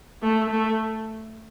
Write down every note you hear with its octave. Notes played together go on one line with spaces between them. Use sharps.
A3
A3